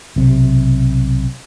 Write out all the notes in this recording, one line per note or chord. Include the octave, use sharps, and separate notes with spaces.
B1 C3